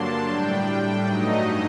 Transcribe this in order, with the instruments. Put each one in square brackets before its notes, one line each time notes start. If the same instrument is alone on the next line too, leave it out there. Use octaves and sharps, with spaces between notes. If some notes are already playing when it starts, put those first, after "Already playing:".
Already playing: [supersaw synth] G2 D3 F#3 A#3 D4 A5 C6
A2 G3 D4 G5
G2 F#3 A3 D#4 D#5